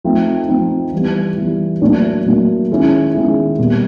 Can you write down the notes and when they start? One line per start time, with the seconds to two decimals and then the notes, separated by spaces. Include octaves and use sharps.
0.04 F3 A3 C4 D#4
0.48 F3 A3 C4 D#4
0.92 E3 G3 B3
1.37 E3 G3 B3
1.81 A2 F#3 A#3 D4
2.25 A2 F#3 A#3 D4
2.70 D#3 G#3 C#4 E4
3.14 D#3 G#3 C#4 E4
3.58 B2 G3 A#3